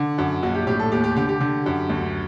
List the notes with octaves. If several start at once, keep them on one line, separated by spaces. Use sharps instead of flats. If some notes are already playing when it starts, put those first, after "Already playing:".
Already playing: D3
F#2
A#1 F#4
G4
A2 G4
A4
D#2 G4
G4
D3 G4
G4
D3
F#2
D2